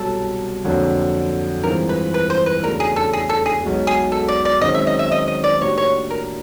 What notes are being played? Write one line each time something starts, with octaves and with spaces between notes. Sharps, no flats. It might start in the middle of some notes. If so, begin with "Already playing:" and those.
Already playing: C2 B2 F#3 A4
F2 D3 F#3 A#3
G2 E3 G#3 C4 F4 A#4
B4
B4
C5
B4
E2 C#3 F#3 A3 D4 A#4
G#4
A4
G#4
A4
G#4
B1 B2 G#3
G#4
A4
D5
D5
F#2 D#3 G#3 C4 D#5
E5
D#5
E5
D#5
D#5
D5
A2 F#3 A#3 D4 G4 C#5
C#5
A#4